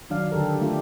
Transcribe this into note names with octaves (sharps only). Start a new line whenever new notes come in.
D#3 F#3 D4 D5 F5
D3 G4 A4 A#4
A3 D4 F4 G4